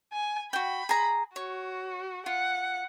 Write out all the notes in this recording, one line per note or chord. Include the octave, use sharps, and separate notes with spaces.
G#5
F#4 G5 B5
G#4 A#5
F#4 C#5
F4 F#5